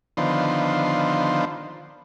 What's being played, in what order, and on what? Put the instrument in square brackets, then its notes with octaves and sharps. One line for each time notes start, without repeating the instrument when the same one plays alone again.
[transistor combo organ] D3 D#3 F3 B3 C5